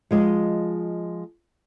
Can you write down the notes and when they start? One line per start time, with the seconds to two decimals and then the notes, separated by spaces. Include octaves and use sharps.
0.11 F3 G#3 D#5